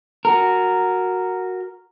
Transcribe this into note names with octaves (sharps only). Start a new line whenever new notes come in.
F#4 A#4